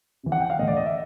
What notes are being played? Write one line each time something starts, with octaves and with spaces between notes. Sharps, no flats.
C3 E3
F#5
G5
F5
A2 E3 D#5
D5
D#5
E5